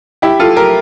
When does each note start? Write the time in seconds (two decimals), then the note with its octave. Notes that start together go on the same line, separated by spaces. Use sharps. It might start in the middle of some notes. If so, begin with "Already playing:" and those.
0.22 E4 G4
0.39 F4 A4
0.56 G4 A#4